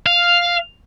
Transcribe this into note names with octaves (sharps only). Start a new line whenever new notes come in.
F5